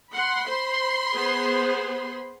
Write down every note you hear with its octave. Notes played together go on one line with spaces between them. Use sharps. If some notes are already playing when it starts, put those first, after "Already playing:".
F#5 B5 C6
C5
B3 G#4 C5